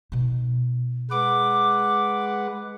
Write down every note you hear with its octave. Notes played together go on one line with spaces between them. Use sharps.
B2 D#4
G#3 B4 F#5 D6